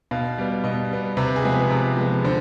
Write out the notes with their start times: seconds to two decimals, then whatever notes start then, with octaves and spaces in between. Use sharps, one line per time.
0.11 B2 F5
0.38 G3 B3
0.64 B2 D#5
0.91 G3 B3
1.17 C3 B4
1.36 G#4
1.44 F3 G#3 B3
1.52 B4
1.70 C3
1.97 F3 G#3 B3
2.24 D3 C5